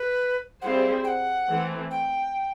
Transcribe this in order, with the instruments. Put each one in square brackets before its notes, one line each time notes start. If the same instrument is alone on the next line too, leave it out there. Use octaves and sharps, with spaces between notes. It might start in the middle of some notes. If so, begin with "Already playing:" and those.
Already playing: [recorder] B4
[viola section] G3 C4 E4 G#4 C5 [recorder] F5 F#5
[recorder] G5
F#5
[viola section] E3 A3 C4
[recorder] G5